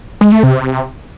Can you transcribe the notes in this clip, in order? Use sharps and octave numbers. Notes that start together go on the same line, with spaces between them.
G#3
A3
C3